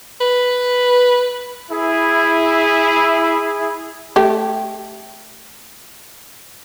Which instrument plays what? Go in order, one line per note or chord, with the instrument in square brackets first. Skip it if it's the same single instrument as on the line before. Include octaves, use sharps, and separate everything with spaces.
[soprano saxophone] B4
[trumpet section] E4 G#4
[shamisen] A3 G4